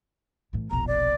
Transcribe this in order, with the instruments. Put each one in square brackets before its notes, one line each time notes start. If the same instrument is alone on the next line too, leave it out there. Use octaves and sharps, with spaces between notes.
[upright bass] A2 E3
[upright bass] E1 A#1 [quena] A#5
[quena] D5